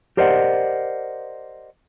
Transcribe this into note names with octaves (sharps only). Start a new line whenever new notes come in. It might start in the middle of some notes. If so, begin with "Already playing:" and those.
G4 A#4 C5 D5 D#5 F#5